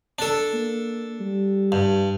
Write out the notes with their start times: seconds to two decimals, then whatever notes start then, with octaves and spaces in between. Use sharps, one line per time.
0.19 D4 A4
0.53 A#3
1.20 G3
1.72 G2